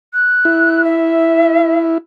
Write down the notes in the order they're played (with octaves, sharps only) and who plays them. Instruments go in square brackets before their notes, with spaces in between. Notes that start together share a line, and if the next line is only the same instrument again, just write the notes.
[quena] F#6
[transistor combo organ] E4
[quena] E5